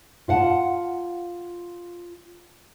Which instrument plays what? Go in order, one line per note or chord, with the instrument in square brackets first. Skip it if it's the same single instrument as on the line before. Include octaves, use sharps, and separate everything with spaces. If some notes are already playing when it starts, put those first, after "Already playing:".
[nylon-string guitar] F4 F5 F#5 A5